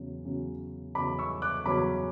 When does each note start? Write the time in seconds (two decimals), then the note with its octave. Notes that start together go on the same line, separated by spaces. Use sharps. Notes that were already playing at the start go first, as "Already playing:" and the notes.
Already playing: E2 C#3 F#3 C#4
0.25 E2 C#3 F#3 C#4
0.95 E2 C#3 F#3 C#4 B5 D6
1.19 C#6 E6
1.42 D6 F#6
1.66 E2 C#3 F#3 C#4 B5 D6